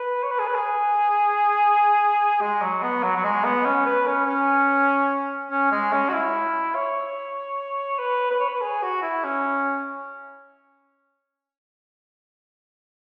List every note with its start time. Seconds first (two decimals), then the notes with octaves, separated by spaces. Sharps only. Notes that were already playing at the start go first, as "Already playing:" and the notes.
Already playing: B4
0.23 C#5
0.32 B4
0.39 G#4
0.47 B4
0.55 G#4
2.41 G#3
2.61 F#3
2.83 B3
3.03 F#3
3.17 F#3
3.24 G#3
3.44 B3
3.65 C#4
3.86 B4
4.07 C#4
4.27 C#4
5.51 C#4
5.72 G#3
5.93 C#4
6.09 F#4
6.14 E4
6.75 C#5
7.99 B4
8.30 B4
8.39 C#5
8.49 B4
8.62 G#4
8.82 F#4
9.02 E4
9.24 C#4